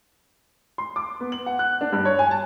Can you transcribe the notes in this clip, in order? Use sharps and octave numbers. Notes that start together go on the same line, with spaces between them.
C6
D6
B3
F#7
F#5
F#6
D4
G2
C#5
G#5
A5